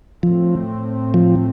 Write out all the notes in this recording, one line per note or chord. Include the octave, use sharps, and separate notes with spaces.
A2 F3 A3 C4
F3